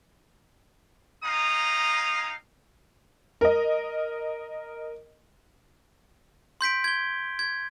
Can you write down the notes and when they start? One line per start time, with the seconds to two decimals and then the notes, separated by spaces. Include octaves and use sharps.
1.23 C4 D#4 F5 G#5 A#5 D#6
3.41 A#4 D#5
6.61 C6 G6 B6 D7
6.84 G#6 G7
7.39 G#6